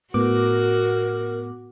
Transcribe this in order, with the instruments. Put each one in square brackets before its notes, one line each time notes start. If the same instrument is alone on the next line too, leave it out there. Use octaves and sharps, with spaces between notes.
[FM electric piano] A2 B3 D6 [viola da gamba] F#4 [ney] A#4